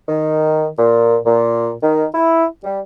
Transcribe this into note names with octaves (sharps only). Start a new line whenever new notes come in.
D#3
A#2
A#2
D#3
E4
G3